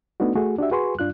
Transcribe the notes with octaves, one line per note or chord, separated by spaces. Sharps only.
A3 B3 D4 D#4 F#4
A3 F#4 G#4
D4 F#4 G4 E5
F#4 G#4 B4 G#5 C6 C#6
G2 D4 F4 F#6